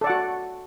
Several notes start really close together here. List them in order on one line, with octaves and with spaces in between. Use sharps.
A4 D5 F#5 F#4